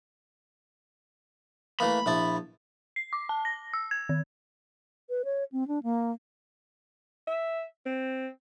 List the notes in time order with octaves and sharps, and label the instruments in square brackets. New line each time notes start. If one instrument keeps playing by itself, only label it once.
[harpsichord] E3 A3 A#3 [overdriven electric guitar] B5
[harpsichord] A#1 E4 A5
[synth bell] C7
D6
A5
A#6
E6
G#6
D#3
[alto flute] B4
C#5
C4
D4
A#3
[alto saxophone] E5
C4